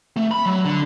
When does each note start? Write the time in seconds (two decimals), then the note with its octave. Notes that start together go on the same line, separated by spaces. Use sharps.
0.16 A3
0.31 B5
0.46 F#3
0.65 D3